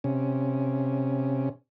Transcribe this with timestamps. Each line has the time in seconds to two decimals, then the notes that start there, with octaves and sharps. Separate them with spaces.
0.04 C3 C#4